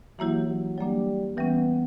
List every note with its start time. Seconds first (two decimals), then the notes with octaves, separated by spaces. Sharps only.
0.19 E3 F#3 A#3 E4 G4
0.48 F#3
0.78 F#3 G3 A#3 D4
1.37 E3 G3 B3 C#4